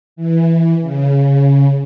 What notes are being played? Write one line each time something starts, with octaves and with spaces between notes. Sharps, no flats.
E3
C#3